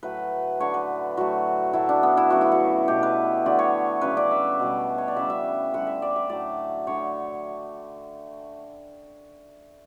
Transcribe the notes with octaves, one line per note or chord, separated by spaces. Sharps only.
A2 F#3 A3 B4
D3 A3 C#5
B4
A2 F#3 A3 F#4
A2 F#3 A3 E4
D4
B3
E4
C#3 F#3 A3 F#4
E4
F#4
B2 A3 G4
B4
D3 F#3 A3 D5
C#5
C#3 F#3 A3 B4
D5
E5
B2 G3
C#5
D5
C#3 E3 G3 E5
E5
D3 G3 F#5
E5
D5
E5
A2 F#3 A3 D5
D3 A3 C#5